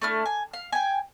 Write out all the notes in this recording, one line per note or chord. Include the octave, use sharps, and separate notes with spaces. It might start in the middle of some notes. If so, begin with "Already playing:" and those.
A3 D4 E4 F6
G#5
F5
G5 G#5